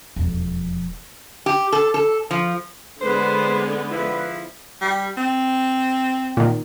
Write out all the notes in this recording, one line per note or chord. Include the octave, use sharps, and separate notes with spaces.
E1 F2
G4
A4
A4
F3
D3 G#3 B3 B4 C5
F3 E4 B4
G3
C4
A#2 D#3